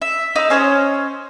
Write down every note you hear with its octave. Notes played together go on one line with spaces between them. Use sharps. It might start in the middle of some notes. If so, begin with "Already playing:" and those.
E5
D#4 E6
C#4 C5 C#5 D#5